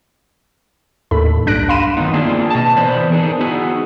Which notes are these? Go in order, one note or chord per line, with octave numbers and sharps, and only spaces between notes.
D#2 A2 A4 B5
B1 G2 D4 F#6 A#6 D7
F5 B5 C6 D#7 E7
D#3 F3 F#3 B3 D#4
A#3 C4 D4 E4 F4 G#4
B2 A5
E3 B3 B4 C5 D5
D4 D#4 G#4 A#4
B3 D#4 E4 F#4 G#4